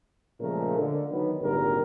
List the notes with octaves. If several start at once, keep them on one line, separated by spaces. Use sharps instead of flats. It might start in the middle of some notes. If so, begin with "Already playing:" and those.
A#2 C#3 F3 G#3 A3 A#4
D3
D#3 F#3 B3
G#1 A#2 D3 G3 G4 A#4